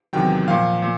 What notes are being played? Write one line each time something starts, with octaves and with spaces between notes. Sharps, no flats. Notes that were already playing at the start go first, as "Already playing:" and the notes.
E2 C3 D#3 F#3 G5
A#2 F3 F5
A#2